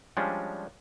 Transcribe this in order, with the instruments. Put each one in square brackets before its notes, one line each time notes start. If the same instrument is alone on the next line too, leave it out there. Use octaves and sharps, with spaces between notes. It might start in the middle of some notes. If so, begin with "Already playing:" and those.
[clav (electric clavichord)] F3 G3 G#3 C#4 D4